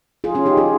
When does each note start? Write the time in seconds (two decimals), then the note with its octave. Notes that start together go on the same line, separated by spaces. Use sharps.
0.24 F4 G#4
0.35 C#4 F4
0.46 D#4 G4
0.57 F4 G#4